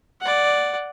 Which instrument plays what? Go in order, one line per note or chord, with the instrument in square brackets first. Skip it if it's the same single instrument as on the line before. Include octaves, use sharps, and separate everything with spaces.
[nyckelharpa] D5 F#5